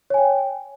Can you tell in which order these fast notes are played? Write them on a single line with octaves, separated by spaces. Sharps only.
C#5 G#5 G5